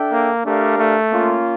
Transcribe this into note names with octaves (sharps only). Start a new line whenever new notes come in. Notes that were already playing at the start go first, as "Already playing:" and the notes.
Already playing: D4 A4 E5 G5
A#3
A3 D4 G4 A#4 D5 F5
A3
A#3 C#4 F4